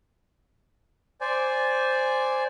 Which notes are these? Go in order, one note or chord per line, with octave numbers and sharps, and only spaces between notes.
C5 D5 G#5